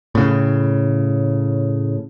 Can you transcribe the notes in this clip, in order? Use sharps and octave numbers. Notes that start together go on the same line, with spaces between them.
A2 C#3